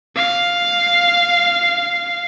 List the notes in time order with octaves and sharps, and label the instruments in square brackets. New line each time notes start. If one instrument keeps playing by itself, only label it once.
[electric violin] F5